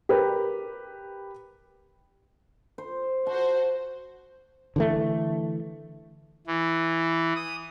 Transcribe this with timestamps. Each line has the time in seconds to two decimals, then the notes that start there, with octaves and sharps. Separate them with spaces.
0.09 G4 A#4 B4
2.78 C5
3.27 F#4 C5 A5
4.76 D3 E3 A3
6.47 E3
7.36 D#6